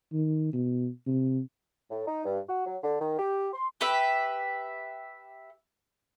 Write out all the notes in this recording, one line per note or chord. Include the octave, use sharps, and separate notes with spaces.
D#3
B2
C3
A2
D#4
G2
F#4
F#3
D3
D#3
G4
C6
G4 B4 E5